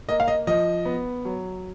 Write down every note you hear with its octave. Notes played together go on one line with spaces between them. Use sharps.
A#3 D#5
F5
D#5
F3 D#5
B3
F#3